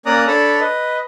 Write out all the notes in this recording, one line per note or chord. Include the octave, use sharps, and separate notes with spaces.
A#3 C#4 D5 A#5 D#6 F#6
D4 A4 C#5 A5 B5
B4 D#5